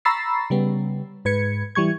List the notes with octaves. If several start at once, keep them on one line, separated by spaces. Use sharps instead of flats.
A#5 B5 C#6 E6 A6 C7
C#3 G3 B3
G#2 B4 G#6 C#7
E3 G3 C#6 G#6